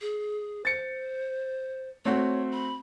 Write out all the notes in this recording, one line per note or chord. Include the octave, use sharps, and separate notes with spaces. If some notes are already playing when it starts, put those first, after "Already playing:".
G#4
C5 A6 C#7
A3 C4 F#4 C#5
B5